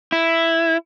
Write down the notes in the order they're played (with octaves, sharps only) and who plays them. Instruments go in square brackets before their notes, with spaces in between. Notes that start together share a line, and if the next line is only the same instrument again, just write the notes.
[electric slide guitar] E4